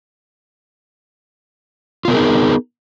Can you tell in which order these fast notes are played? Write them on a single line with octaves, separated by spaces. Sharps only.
F4 B3 A#4 G#4 D#4